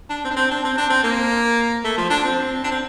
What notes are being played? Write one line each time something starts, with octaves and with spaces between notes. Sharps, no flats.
D4
C4
D4
C4
D4
C4
D4
C4
A#3
A3
F3
D4
C4
D4
C4